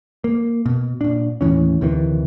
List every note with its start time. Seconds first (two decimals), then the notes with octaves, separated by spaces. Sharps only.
0.24 A#3
0.66 B2
1.01 A#2 D4
1.41 D#2 A2 E3 C#4
1.81 D2 C3 D#3 E3